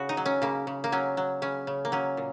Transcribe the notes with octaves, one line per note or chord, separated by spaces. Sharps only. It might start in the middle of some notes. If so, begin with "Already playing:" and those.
Already playing: C#3 F#4
D#4
F#3
C#4
C#3 A#3
C#3
A#3
F#3 C#4
F#3
C#3 C#4
C#3
A#3
F#3 C#4
A#2